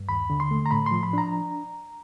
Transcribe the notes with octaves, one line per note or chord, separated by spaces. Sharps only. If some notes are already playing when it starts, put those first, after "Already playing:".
Already playing: G2
D#2 B5
D3
C6
A3
A#5
A2 B5
C6
F3
B5
D4 A#5